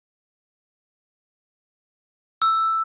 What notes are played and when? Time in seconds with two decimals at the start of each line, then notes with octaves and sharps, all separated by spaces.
2.42 E6